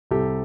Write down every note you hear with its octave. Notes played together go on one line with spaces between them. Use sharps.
C2 G4 A4